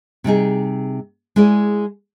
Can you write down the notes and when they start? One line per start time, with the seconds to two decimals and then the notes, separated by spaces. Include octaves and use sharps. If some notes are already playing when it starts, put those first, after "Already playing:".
0.24 C3 G3 D#4 G#4
1.36 G#3 E4 G#4 D5